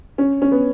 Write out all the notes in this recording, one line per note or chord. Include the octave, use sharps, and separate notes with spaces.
C#4
C#4
B3